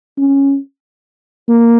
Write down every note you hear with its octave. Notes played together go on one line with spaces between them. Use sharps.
C#4
A#3